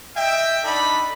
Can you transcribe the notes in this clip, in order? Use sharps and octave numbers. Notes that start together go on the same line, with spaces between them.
D#5 E5 G5
D4 D#4 A4 D5 B5